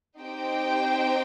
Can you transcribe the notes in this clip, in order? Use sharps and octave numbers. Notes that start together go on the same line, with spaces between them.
C4 D#4 G4 C5 G5